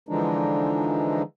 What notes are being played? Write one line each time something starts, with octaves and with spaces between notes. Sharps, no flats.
D3 E3 F3 G#3 D4 D#4